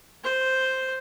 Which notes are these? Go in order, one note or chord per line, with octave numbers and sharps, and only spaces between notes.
C5